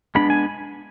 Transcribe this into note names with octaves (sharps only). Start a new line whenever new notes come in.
G#3 B3 D4 B5
G#5